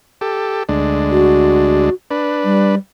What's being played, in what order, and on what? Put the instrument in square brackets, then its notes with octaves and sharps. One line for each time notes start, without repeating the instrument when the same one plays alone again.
[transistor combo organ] G4 A4
D2 G#3 D4
[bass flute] F#4
[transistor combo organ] D4 B4
[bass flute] G3